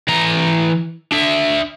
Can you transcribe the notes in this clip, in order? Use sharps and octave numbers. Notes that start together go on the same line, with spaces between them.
E3 A#5
D4 E5